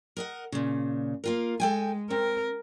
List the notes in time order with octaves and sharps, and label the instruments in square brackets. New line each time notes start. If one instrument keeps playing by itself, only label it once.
[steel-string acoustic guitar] A#4 D#5 F#5
A#2 C#3
A#3 F4 A#4
[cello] G#3 [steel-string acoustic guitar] A4 G5 G#5
[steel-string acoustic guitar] C4 [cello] A#4